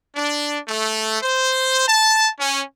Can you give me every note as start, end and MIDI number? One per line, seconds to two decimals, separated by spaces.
0.15 0.59 62
0.68 1.21 57
1.22 1.85 72
1.87 2.29 81
2.40 2.63 61